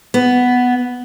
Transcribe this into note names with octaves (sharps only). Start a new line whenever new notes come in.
B3